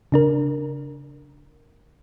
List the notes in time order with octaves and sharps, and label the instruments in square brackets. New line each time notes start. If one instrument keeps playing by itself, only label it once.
[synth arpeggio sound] C#3 D4 A#4